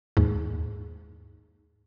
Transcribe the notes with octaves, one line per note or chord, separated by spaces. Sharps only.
D#2 G#2